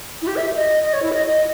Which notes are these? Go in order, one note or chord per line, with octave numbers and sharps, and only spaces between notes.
E4
G4
E5
D#5
D#5
C#5
E4
D#5
D#5